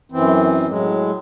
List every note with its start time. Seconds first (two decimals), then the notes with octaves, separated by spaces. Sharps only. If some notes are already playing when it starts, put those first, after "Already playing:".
0.12 F#2 E3 C4
0.68 A2 F#3 G#3